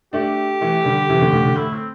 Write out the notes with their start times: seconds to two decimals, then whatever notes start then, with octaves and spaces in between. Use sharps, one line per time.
0.13 A3 D4 G4
0.61 E3 A3
0.85 D3 G3
1.09 C3 E3
1.21 A2 D3
1.33 A2 D3
1.45 A2 D3
1.56 A2 E4
1.73 C4